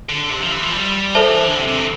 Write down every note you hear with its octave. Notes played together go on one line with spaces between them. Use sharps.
D3
C3
F3
E3
F3
G3
F3 A4 C5 E5 A5
E3
D3
C3
C3
E3